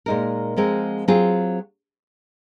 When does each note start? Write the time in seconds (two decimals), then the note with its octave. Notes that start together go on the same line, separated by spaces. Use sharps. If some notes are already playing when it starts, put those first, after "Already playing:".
0.06 A#2 G#3 D#4 A#4
0.56 F3 G#3 C4 F#4 A#4
1.08 F#3 C4 F4 G#4